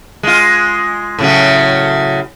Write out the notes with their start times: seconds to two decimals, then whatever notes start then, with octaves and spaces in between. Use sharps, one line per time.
0.23 G#3 F4
1.19 A2 C#3 F#3